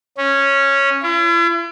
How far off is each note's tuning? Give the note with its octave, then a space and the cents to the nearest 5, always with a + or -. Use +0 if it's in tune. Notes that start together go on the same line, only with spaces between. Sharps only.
C#4 -5
E4 +45